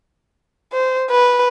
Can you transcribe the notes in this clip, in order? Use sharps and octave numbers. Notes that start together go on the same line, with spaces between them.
C5
B4